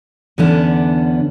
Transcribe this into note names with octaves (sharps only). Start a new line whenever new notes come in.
E2 D3 B3 C#4 D4